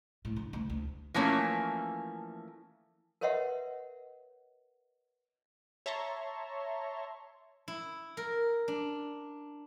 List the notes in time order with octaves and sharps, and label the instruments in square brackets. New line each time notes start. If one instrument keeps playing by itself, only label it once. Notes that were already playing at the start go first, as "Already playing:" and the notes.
[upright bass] A2
D3
D2
D2
[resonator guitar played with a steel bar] E3 F3 A3 A#3 C#4
[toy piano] A#4 B4 C#5 D#5 E5 F#5
[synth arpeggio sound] C#5 E5 A5 A#5 C6 C#6
[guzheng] E4
A#4
D4